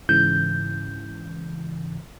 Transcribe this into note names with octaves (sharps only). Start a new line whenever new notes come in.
G#2 C#3 E3 G6